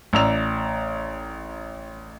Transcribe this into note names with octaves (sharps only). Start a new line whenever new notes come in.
A1 D5 A#5 E6 F7